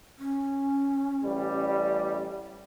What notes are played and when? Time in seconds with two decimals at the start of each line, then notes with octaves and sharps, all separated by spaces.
0.18 C#4
1.23 A1 G3